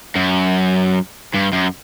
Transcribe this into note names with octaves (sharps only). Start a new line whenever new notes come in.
F#2
G2
F#2